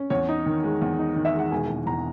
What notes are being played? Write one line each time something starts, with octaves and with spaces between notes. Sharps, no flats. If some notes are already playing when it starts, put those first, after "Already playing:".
Already playing: C#4
E2 C#5
D#4
D#3
G#3
E2
D#4
D#3
E5
G#3 F#5
E1 G#5
E1
E2 A#5